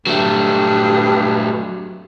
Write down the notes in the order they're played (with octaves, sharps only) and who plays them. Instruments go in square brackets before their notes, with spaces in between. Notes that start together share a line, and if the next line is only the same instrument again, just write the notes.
[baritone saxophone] G2 [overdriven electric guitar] F#3 A3